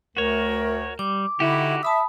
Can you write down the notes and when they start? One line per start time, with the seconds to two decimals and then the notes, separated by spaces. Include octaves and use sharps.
0.17 D2 A3 F#4 A#4 C#5
0.99 G3 D6
1.40 D3 D#4 E4 F#4 G4
1.83 E5 A5 B5 D#6